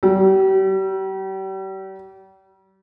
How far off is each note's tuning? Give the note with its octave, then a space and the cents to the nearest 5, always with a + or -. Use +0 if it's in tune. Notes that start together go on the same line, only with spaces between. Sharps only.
G3 -40